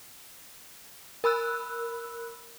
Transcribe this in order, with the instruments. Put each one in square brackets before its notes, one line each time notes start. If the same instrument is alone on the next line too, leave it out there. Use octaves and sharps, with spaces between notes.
[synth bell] A#4 B5 E6 F#6